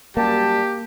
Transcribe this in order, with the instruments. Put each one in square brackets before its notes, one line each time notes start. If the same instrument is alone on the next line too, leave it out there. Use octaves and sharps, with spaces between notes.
[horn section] F#2 G3 A5 [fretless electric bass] A#3 [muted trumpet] G4